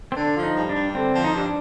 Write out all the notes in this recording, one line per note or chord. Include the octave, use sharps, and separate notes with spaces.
C4
D3 D4
F3
D#4
G2
D4
G2
D3 C4
F3
D#4
G2 D4